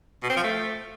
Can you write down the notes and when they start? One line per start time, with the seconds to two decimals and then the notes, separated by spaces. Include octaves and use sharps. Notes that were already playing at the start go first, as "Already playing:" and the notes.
0.23 B2
0.29 C4
0.36 F3
0.43 A3